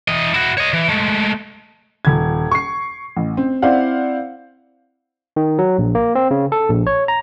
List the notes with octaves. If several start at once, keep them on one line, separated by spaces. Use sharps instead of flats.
E3 D#5
E4 F#4
C#5 D#5
E3
G#3 A3
D#1 G#6
C#6 C7
A1
C4
C4 E4 C5 D5 F5 F#5
D#3
F#3
A#1
A#3
C4
C#3
A4
A#1
C#5
A#5